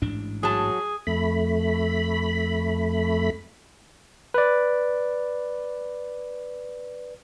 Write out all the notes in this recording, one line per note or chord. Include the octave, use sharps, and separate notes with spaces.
A1 G#2 D4
F#3 G#4 A5
F2 A3 B5
B4 D5